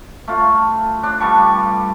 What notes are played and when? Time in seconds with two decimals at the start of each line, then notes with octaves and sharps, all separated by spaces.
0.28 A3 F4
1.03 D4
1.20 G2 G3 A5 C#6